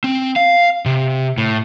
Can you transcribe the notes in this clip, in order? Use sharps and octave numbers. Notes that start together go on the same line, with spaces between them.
C4
F5
C3
A2